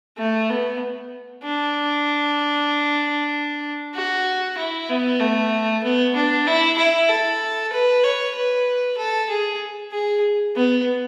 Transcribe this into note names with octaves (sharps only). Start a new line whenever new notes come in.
A3
B3
D4
F#4
E4
B3
A3
B3
D4
E4
E4
A4
B4
C#5
B4
A4
G#4
G#4
B3